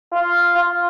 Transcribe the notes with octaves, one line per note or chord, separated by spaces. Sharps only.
F4
F4